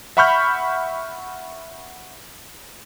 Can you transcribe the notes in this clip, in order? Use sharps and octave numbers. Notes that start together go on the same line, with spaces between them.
E5 F#5 B5 C#6 F6 G6